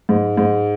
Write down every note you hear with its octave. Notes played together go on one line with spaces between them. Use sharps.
G#2
G#2